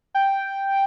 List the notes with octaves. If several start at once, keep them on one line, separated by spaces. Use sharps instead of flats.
G5